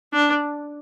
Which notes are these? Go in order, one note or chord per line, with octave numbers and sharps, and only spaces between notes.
D4